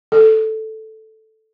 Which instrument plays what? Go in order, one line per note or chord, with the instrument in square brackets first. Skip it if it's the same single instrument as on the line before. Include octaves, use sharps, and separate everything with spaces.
[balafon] A4